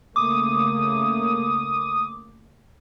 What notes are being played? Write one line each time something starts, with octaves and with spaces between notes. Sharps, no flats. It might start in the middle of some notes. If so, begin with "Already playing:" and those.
C#3 A3 A#3 D6 D#6